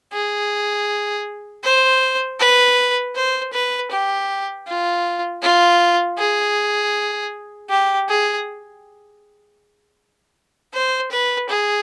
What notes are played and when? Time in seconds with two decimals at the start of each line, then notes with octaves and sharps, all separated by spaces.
0.13 G#4
1.64 C5
2.40 B4
3.15 C5
3.53 B4
3.91 G4
4.68 F4
5.42 F4
6.18 G#4
7.70 G4
8.09 G#4
10.74 C5
11.11 B4
11.49 G#4